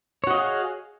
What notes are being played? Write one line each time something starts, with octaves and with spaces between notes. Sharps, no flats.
F#4 G#4 C#5 D#5 F5